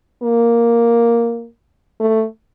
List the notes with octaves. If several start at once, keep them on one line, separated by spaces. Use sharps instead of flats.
A#3
A3